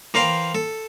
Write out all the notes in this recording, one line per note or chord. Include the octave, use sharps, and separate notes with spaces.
E3 A#4 C5 F5 G5
A4